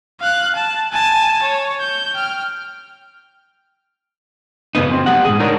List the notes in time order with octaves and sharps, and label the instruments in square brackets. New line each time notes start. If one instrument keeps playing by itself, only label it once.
[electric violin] F5 F#6
A5
G#5 A5
C#5
G6
G5 F6
[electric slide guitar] G2 C#3 B3 D#4
F#2 C4
G3 B3 G4 F#5
G#2 C3 G#4
D4 D#4 A#4 C#5